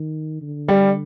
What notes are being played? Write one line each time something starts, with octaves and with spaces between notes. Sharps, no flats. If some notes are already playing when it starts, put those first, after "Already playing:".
Already playing: D#3
D3
G3